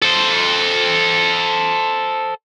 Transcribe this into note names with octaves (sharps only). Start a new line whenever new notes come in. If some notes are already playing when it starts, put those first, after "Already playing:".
A4 C5